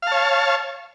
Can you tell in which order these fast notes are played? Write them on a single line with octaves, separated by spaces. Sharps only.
F5 A5 C#5